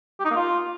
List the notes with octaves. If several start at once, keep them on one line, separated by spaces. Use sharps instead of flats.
G4
D#4
A#3
F4